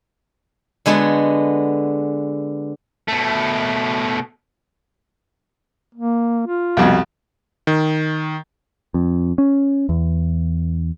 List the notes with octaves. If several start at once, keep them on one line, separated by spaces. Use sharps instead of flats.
D3 G#3 B3 F#4 A5
B2 A3
A#3
F4
C2 F2 B2
D#3
F2
C#4
E2